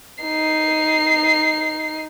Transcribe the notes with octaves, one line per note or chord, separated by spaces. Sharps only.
D#4 C7